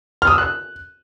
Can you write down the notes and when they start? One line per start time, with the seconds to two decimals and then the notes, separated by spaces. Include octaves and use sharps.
0.22 F6
0.27 D#6
0.33 E6
0.38 F#6